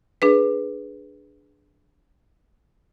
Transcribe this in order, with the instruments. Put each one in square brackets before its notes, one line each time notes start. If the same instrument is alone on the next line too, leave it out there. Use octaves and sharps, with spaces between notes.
[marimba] D4 G#4 B4